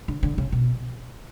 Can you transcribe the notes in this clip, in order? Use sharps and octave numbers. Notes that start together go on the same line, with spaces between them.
D3
D3
C#3
B2